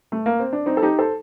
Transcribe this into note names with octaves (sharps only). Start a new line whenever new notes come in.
A3
A#3
C4
D4
C4 D#4
A4
D#4 G4
A4 C5